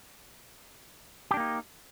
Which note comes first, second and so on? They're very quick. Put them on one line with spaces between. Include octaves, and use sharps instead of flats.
G4 D4 A#3 D#4